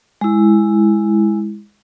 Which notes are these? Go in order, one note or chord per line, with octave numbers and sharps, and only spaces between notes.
G#3 E4